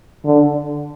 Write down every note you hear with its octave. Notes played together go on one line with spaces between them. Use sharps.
D3